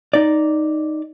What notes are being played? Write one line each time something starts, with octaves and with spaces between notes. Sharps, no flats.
D#4 D5